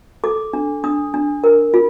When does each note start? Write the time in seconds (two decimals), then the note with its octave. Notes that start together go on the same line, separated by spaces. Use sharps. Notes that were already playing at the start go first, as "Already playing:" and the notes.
0.24 A4 D6
0.53 D4
0.84 D4 D#6
1.14 D4
1.44 A#4
1.74 F4